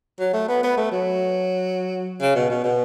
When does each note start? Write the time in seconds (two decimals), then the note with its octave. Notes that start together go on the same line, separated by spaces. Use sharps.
0.20 F#3
0.34 A3
0.49 B3
0.63 B3
0.77 A3
0.92 F#3
2.21 C#3
2.35 B2
2.50 B2
2.64 B2